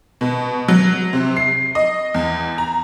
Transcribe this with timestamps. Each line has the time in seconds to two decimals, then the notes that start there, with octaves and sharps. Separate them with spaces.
0.21 B2
0.68 F#3
1.13 C3
1.37 C7
1.75 D#5
2.14 E2
2.58 A#5